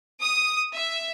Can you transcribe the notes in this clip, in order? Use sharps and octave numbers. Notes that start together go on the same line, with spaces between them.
D#6
E5